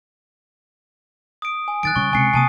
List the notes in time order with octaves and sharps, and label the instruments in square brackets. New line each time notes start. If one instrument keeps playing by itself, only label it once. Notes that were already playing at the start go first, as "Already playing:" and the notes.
[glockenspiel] D#6 D7
G#5
[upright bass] D#3 [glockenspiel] F#6 A6 D7
[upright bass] C#3 G3 [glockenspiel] C#6
[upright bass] C#2 C3 [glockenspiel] G#5 C7 C#7
[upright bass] C3 A#3 [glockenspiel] G#5 A5 D#6